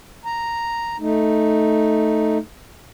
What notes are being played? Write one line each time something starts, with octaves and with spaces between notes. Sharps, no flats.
A#5
A3 D#4